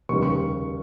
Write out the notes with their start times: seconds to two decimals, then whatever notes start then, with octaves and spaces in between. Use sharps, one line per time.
0.09 F1 D#2 C#3 G3 C#6
0.23 C#6